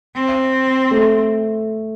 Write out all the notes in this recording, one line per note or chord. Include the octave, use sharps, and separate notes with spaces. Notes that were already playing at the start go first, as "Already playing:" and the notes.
C4
A3